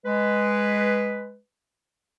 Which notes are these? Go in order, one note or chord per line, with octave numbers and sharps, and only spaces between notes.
G#3 B4